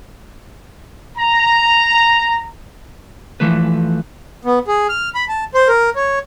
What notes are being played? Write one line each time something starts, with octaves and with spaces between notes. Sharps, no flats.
A#5
E3 F3 A3 B4
B3
G#4
F6
B5
A5
C5
A#4
C#5